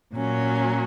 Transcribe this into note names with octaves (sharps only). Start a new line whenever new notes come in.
A#2 F#3 C#4